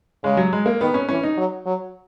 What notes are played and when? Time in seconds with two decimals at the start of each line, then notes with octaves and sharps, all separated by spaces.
0.24 C#3 G#3
0.37 F#3
0.53 G#3
0.66 A#3
0.81 D#3 B3
0.94 C#4
1.09 E3 C#4
1.23 D#4
1.37 F#3
1.66 F#3